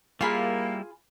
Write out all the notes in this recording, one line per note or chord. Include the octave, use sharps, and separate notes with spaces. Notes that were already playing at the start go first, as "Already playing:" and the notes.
G3 A#3 E4 F4 G#4 B5